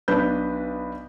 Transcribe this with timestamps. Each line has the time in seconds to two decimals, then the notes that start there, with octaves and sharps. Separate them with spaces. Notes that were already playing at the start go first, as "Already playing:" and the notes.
0.08 B1 D4 B4 G6